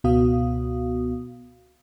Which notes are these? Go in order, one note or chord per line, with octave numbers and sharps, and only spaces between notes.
C#2 B2 B3 F#4 F5 D#6